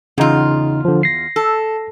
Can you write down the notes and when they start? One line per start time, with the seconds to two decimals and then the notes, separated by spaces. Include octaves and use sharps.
0.18 E2 C#3 D#4 F4
0.85 D3 F3
1.03 A#6 C7
1.36 A4